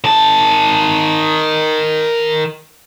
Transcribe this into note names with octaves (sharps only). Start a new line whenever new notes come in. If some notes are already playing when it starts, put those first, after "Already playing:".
D#3 A5